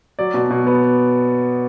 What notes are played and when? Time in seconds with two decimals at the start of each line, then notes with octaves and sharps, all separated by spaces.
0.19 F#3 D5
0.34 B2
0.50 B2
0.67 B3